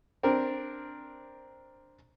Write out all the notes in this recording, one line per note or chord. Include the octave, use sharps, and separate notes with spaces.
C4 D4 A#4